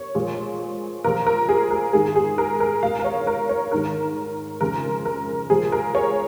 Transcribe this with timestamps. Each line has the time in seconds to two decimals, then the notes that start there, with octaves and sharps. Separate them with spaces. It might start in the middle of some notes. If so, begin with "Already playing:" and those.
Already playing: C#5
0.15 A#2 F3 G#3
1.04 A#2 F3 G#3 A#4
1.27 A#4
1.49 G#4
1.71 A#4
1.93 G#2 D#3 G#3 G#4
2.16 G#4
2.38 A#4
2.60 A#4
2.82 A#2 G#3 F5
2.99 A#4
3.05 C#5
3.27 A#4
3.49 C#5
3.72 G#2 D#3 G#3 A#4
4.61 F2 C#3 G#3 A#4
5.06 A#4
5.50 A#2 F3 G#3 G#4
5.72 A#4
5.95 C#5